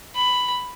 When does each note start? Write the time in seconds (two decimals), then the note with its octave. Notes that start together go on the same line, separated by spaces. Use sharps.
0.16 B5